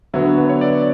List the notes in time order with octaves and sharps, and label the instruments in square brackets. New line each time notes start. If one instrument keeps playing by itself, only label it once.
[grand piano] D3 F#3 B3 [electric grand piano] E5
[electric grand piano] B4
C#5
D5